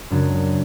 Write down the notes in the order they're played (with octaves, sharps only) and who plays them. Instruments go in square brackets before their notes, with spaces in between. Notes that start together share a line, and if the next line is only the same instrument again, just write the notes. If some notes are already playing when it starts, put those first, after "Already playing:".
[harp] F#2 C#3 G#3 D4 F#4